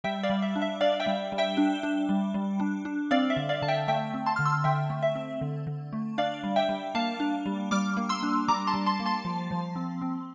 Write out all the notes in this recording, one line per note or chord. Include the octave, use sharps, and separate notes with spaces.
G3 E5 G5
D5 F5
G3
E5
D4
E5
D4 D5 F5
E5 G5
G3
G3
E5 G5
D4
D4
G3
G3
D4
D4
C4 D5 F5
E5
D3
D5 F5
D3 A5
E5 G5
A3 E5 G5
C4
A5 C6
D3 F6
C6 E6
D3 E5 G5
A3
E5
C4
D3
D3
A3
D4 D5 F5
G3
E5 G5
G3
A#3 F5 A5
D4
G3
G3 D6 F6
A#3
C6 E6
D4
G3 A#5 D6
A5 C6
G3
A5 C6
A#3
A5 C6
F3
F3
C4
C4